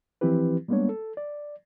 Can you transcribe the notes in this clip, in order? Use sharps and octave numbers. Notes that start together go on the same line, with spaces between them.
E3 F3 C4 E4 G4 B4
G3 G#3 A#3 B3 D4 C#5
A4
D5